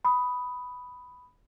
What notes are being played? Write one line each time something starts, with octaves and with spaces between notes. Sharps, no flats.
B5 D#6